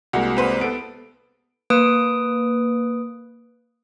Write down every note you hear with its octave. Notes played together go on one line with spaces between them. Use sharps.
C2 G#3 A#3 F#4
C4 B4 C5
B3 A4 D7
A#3 B4 D#6 D7